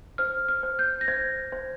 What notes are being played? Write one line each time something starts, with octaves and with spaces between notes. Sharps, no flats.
C5 F6
F6
C5
G6
A#6
C5 G#6
C5